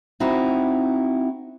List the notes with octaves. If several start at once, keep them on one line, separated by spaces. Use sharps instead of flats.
C4 D#4 E4 F#4